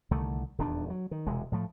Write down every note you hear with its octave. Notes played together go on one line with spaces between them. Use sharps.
C2 D3 D#3 A3
D#1 E2 D#3 D4
F#3
D#3
E1 C3 G#3
A2 F3 A3